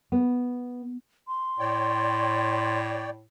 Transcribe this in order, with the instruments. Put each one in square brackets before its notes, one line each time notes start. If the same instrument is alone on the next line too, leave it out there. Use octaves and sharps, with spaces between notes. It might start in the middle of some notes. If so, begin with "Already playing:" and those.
[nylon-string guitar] B3
[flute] C6
[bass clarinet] A2 [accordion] C#5 D5 G5